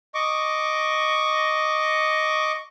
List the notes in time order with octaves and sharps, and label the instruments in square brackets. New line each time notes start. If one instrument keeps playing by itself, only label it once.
[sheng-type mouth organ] D#5 C#6 D6